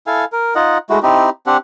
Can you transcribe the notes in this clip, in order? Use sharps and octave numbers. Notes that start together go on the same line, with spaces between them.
E4 A4 F5 G#5
A#4
D#4 F4 D#5 F#5
G#3 A3 E4 F#4
C4 D#4 E4 G4
C4 D4 G4 F#5